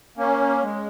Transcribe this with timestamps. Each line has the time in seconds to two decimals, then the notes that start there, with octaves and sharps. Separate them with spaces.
0.17 A#3 C#4
0.63 G#3